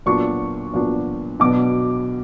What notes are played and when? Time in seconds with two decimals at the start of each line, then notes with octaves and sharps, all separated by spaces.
0.06 A#2 F#3 B3 D4 C#6
0.74 A#2 F#3 B3 D4
1.40 B2 F#3 B3 D4 D6